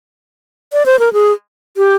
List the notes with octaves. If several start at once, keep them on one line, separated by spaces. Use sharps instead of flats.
D5
C5
A#4
G#4
G4